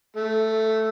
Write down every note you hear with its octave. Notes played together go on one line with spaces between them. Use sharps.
A3